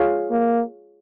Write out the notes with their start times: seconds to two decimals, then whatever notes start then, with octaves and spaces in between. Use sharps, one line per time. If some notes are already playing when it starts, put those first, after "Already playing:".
Already playing: F4 G#4 C#5 F5
0.30 A#3